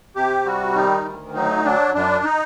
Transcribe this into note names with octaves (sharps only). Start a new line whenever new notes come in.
C3 G4
G3 F#4
D#3 D#4
D2
F#3 D#4
F#3 D4
F#2 D4
D#4